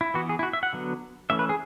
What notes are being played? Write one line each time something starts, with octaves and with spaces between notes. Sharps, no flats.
E4
E3 B3 F#4
G#4
E4
F#4
E5
F#5
D3 F#3 B3
E3 A3 C#4 E5
B4
G#4